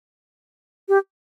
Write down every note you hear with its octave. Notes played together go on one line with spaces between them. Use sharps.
G4